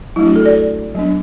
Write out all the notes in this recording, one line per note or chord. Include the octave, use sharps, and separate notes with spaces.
F#3 A3 D4 E4
F#4
A4
D5
F#3 B3 D4